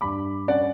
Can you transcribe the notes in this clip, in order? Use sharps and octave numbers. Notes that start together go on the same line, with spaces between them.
G2 B5 D6
C#4 D5 F#5